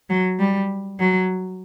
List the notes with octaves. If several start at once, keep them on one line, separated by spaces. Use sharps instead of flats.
F#3
G3
F#3